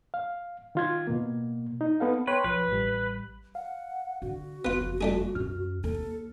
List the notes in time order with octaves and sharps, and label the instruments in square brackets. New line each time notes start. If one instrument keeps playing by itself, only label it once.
[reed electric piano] F5
D#3 F4 G#6
B2 A#3
D#4
B3 A4 F5
[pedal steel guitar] B4 [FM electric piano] C#5 G5 C6
[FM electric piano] B1 F3 [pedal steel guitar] B4
[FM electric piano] A1 G3
[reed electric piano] F5 [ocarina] F#5
[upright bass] D3 [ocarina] F#4
[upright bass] F#1 F2 [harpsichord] B3 F4 [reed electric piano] F#6
[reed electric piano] G3 F4 [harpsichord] A3 D4 G#4
[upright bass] F#2 C#4 [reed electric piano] F6
[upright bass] D#2 [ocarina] A4